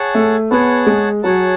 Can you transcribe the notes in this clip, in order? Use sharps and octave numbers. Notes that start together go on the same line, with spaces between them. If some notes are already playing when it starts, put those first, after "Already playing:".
Already playing: G#4 C#5 F#5 A5
A3
B3 G#4 C#5 F#5 A5
G#3
F#3 G#4 C#5 F#5 A5